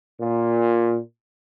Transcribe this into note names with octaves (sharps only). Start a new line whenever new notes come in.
A#2